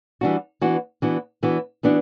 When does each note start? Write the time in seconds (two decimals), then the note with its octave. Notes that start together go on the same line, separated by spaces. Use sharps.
0.21 E3 G3 D4 F#4
0.61 E3 B3 D4 F#4
1.02 E3 B3 D4 F#4
1.43 E3 B3 D4 F#4
1.83 E3 B3 D4 F#4